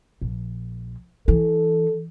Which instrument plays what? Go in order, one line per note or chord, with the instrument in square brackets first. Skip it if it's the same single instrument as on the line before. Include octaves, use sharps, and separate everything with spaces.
[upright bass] A#1
[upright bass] E3 [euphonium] A4